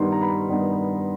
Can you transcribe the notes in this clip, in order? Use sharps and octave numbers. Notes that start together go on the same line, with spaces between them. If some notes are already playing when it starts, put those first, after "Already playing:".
Already playing: G2 D#3 G3 B3 D#4 C6
A#5
B5
G2 D#3 G3 B3 D#4